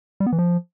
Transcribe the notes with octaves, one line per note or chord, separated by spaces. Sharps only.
G3
B3
E3
F3